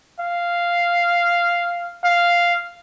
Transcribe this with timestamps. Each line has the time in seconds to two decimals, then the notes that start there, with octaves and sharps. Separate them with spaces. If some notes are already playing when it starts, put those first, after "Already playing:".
0.20 F5
2.04 F5